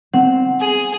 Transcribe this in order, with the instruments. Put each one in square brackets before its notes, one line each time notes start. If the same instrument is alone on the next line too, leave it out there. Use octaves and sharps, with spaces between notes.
[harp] C4 [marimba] F#5
[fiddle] G#4